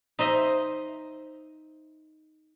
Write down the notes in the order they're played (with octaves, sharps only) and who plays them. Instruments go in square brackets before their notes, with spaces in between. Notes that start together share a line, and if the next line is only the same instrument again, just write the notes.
[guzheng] D#4 C5 D#5 E5